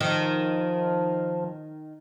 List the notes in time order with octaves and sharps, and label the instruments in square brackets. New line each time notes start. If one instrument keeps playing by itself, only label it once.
[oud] D#3 [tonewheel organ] F3